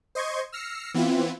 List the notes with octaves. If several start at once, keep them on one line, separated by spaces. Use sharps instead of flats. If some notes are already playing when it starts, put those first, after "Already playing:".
C5 D#5 C6 C#6 G#6
E6 F6 A#6 C7 C#7
E3 B3 C4 E4 F4